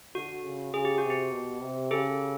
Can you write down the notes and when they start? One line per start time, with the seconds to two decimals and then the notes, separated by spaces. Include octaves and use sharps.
0.15 D3 F#4
0.44 C#3
0.74 C#3 G#4
0.85 G4
0.98 F#4
1.03 C3
1.10 G4
1.33 B2
1.62 C3
1.91 C#3 G4 A4